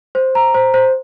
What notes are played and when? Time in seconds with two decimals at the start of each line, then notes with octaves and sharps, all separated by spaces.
0.15 C5
0.35 A#5
0.54 C5
0.74 C5